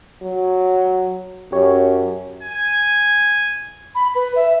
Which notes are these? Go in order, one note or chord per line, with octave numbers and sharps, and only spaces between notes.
F#3
F#2 G4 C#5
G#5
B5
B4
E5